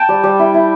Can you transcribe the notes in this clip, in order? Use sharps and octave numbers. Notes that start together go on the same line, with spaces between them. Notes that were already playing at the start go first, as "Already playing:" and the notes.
Already playing: G5 A5
G3
G3
E4
E4